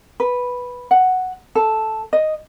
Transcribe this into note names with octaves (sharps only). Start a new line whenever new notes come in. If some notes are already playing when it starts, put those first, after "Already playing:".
B4
F#5
A4
D#5